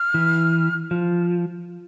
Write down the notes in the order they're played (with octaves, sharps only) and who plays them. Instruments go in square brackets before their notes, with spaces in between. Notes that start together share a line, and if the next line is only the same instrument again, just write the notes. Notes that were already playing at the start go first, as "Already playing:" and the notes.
Already playing: [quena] F6
[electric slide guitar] E3
F3